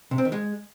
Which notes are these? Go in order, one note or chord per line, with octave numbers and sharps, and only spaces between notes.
C3
C4
D#3
G#3